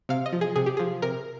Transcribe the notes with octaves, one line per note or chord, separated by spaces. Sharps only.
C3 F5
D#5
F3
G#4
C3 G#4
G4
F3 G#4
C3 A#4